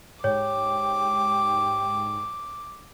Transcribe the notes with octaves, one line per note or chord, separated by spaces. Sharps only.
G#2 G4 C#5 D6